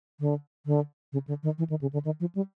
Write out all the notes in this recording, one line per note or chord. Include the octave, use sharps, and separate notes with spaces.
D3
D3
C#3
D3
D#3
E3
D#3
C#3
D3
D#3
F3
G3